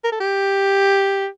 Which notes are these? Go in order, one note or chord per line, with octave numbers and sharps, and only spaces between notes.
A#4
A4
G4